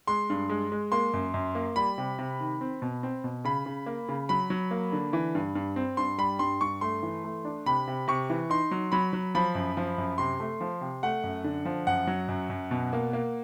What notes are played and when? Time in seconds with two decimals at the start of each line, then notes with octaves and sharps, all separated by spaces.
0.07 G#3 C6
0.30 G2
0.50 G#3
0.72 G#3
0.92 A#3 C6
1.13 F#2
1.34 F#2
1.55 A#3
1.76 G3 B5
1.98 C3
2.19 C3
2.40 D#3
2.61 C4
2.82 B2
3.03 C4
3.24 B2
3.45 C#3 B5
3.66 C#3
3.86 A#3
4.09 C#3
4.29 F#3 B5
4.50 F#3
4.71 A#3
4.92 D3
5.13 E3
5.35 G2
5.55 G2
5.76 C4
5.97 G2 C6
6.18 G3 B5
6.39 G2 C6
6.61 G2 C#6
6.81 A3 C6
7.03 E3
7.24 A3
7.45 D4
7.66 C3 B5
7.88 C3
8.08 C3 C#6
8.30 E3
8.50 D#4 C6
8.71 F#3
8.92 F#3 B5
9.13 F#3
9.35 F3 B5
9.55 F#2
9.77 F3
9.98 F#2
10.18 C3 C6
10.40 A3
10.61 F3
10.81 C3
11.03 A3 F#5
11.24 F#2
11.44 D3
11.65 F3
11.87 F#2 F#5
12.07 F#3
12.28 F#2
12.50 F#2
12.71 B2
12.93 A#3
13.13 A#3